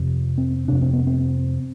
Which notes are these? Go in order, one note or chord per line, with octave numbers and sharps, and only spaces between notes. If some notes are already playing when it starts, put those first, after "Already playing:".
Already playing: F2 C3
C4
F2 C3 D4
C4
B3
C4